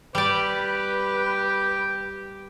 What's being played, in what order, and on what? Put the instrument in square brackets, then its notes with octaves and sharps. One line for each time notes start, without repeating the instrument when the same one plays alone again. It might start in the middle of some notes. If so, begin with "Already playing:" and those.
[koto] G3 D5 [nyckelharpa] G4 G5 [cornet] B4